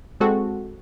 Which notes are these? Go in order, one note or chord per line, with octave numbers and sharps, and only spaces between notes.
G#3 C4 F#4 A4